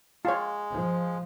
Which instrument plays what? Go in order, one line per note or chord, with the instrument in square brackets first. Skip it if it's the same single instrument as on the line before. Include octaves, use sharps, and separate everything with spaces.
[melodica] G#3 [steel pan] F4 C#5
[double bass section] F3